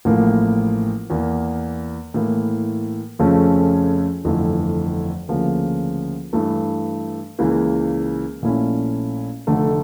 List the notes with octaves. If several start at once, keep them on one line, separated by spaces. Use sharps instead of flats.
A1 A2 F3 A#3
E2 E3 A#3
A2 E3 A#3
F2 C#3 F3 A3 C#4
G1 F2 E3 A3
D2 C#3 F3 A#3
G2 E3 A3
C#2 C#3 E3 A#3
A#1 A#2 A3 C#4 E4
F1 F2 D3 A3